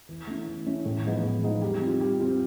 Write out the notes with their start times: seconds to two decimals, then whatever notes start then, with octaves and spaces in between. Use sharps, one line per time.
0.09 E3
0.27 A3 C#4 E4
0.47 E3
0.66 A3 C#4 E4
0.85 A2
1.04 F3 G#3 B3 D#4
1.24 A2
1.43 F3 G#3 B3 D#4
1.62 G3
1.81 C4 F4
2.00 G3
2.20 C4 F4